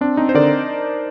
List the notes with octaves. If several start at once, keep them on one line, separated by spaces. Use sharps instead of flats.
C4 D4
C4 D#4
C5
D3 A#4 D5